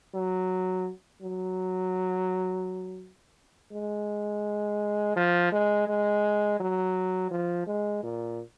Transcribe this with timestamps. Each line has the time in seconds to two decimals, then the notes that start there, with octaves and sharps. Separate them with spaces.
0.15 F#3
1.22 F#3
3.73 G#3
5.16 F3
5.52 G#3
5.88 G#3
6.60 F#3
7.31 F3
7.67 G#3
8.03 A#2